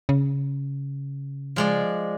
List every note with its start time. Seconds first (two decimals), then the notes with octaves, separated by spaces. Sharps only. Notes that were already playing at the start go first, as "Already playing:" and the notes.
0.09 C#3
1.56 F3 G#3 D5